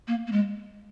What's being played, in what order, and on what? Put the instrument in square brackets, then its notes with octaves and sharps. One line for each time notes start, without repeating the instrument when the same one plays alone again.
[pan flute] A#3
A#3
G#3